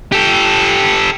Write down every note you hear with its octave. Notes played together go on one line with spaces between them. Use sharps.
G4 A4